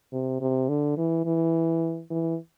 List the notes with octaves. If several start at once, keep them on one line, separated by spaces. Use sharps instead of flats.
C3
C3
D3
E3
E3
E3